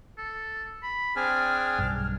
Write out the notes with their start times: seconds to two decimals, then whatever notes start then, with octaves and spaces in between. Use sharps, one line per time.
0.18 A4
0.83 B5
1.16 C4 D4 G#4 G#5 F6
1.79 B1 G2